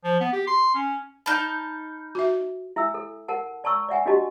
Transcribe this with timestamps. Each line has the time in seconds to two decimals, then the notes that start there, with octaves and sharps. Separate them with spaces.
0.04 F3
0.20 B3
0.33 G4
0.47 C6
0.75 C#4
1.26 D#4 A5 B5 F6 G6
2.15 F#4 E5
2.76 E4 E5 G#5 E6
2.94 A4
3.28 A#4 F#5 A5
3.64 D5 A5 A#5 C#6 E6
3.89 D5 E5 F#5 G#5
4.06 D4 E4 F#4 G4 D#5 A5